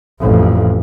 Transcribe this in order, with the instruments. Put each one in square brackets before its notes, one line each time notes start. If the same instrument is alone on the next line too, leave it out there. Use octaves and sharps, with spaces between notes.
[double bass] A1 F2